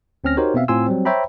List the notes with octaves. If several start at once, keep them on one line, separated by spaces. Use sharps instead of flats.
D2 C4 C#4 F6 A#6
D#4 F#4 G4 A#4 C5 C#5
B2 B3 C4 E5 F5
A2 C4 F4 G#5 C6 E6
F#3 G3 C4
C5 C#5 E5 G5 A#5 B5